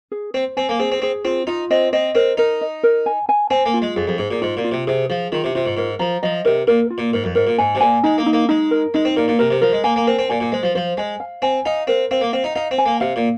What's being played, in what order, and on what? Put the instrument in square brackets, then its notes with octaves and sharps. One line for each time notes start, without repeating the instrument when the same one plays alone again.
[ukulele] G#4
[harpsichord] C4 [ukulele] C5
[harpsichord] C4 [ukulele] G#5
[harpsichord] A#3
[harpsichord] C4 [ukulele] G#4
[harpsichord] C4
[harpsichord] C4 [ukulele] G#4
[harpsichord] C4 [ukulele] F4
[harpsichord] D#4 [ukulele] F4
[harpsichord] C4 [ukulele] D#5
[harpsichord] C4 [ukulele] D#5
[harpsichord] C4 [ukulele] A#4
[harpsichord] D#4 [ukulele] A#4
[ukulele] D#5
A#4
G#5
G#5
[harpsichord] C4 [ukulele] G#5
[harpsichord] A#3
[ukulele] F4
[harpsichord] G#3
[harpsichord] F2 [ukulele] G#4
[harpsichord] F2
[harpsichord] G#2 [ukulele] G#4
[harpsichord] A#2
[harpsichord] G#2 [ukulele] F4
[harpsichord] A#2
[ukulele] F4
[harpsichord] C3
[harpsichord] C3 [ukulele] G#4
[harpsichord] F3 [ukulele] G#4
[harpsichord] D#3 [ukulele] F4
[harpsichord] C3
[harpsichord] C3 [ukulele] F4
[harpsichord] G#2
[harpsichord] G#2 [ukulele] A#4
[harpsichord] F3 [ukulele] A#5
[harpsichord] F3 [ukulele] D#5
[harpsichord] C3 [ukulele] A#4
[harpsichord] A#2 [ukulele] A#4
[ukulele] F4
[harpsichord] A#2
[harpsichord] G#2 [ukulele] A#4
[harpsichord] F2
[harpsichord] G#2 [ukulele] A#4
[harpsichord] A#2
[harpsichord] G#2 [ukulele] G#5
[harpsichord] C3
[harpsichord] A#2 [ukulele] G#5
[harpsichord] G#3 [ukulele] D#4
[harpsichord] A#3
[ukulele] D#4
[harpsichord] A#3
[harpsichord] G#3 [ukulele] D#4
[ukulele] A#4
[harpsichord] G#3 [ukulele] D#4
[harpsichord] C4
[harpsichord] A#2 [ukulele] A#4
[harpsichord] A#2
[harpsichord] C3 [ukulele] A#4
[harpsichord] C3
[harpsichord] F3 [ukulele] A#4
[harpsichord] G#3
[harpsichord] A#3 [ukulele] G#5
[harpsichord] A#3
[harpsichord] C4 [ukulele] A#4
[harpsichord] C4
[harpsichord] A#2 [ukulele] G#5
[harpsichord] A#2
[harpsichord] G#3 [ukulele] C5
[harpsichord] F3
[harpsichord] F3 [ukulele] C5
[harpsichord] G#3 [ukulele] G#5
[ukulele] F5
[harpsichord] C4 [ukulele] G#5
[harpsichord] D#4 [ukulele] F5
[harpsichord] C4 [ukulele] A#4
[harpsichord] C4 [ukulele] F5
[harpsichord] A#3
[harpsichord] C4 [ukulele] F5
[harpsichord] D#4
[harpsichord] D#4 [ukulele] F5
[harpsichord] C4
[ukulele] G#5
[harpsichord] A#3
[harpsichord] C3 [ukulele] F5
[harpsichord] A#2